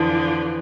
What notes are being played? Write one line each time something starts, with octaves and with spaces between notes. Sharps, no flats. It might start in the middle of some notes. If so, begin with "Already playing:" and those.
Already playing: F2 D3 E3 F3